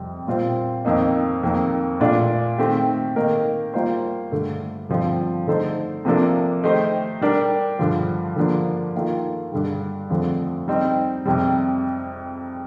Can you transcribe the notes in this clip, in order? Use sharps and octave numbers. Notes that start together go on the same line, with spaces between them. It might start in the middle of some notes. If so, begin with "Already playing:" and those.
Already playing: F2 C3 G3 C4
A#2 G3 C4 F4 C5
F2 D#3 A#3 D#4
F2 D#3 A#3
A#2 A3 D4 F4
D#3 A3 C4 G4
D#3 A#3 D#4 A#4
G3 A#3 F4 C5
G2 D3 A3
G2 D3 F3 C4 F4
D3 A3 D#4 A4 C5
C3 F3 A#3 D4 A4
D#3 A3 D#4 G4 C5
G3 D4 G4 A#4
G2 D3 F3
D3 F3 A#3 D4
D#3 A#3 F4 A4
G2 D3 G3
F2 D3 F3 A3
G3 C4 D#4
F2 C3 G3